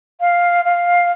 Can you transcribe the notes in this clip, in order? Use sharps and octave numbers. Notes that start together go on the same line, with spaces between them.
F5
F5